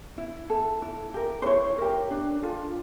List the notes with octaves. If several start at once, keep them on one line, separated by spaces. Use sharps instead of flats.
E4
A4
E4
G4 A#4
C5
E4 C#5
G4 A#4
D4
F4 A4